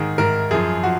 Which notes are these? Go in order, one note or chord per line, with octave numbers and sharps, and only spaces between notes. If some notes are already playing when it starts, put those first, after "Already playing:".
Already playing: G#2 D#3 G#4
G#2 D#3 A#4
F#2 F3 G#4
F3 F#4